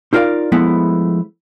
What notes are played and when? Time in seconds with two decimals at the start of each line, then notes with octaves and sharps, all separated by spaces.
0.13 D#4 F4 A#4 B4 D5 F5
0.52 F3 G#3 A3 B3 E4